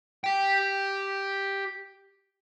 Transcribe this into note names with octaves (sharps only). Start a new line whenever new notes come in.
G4 G5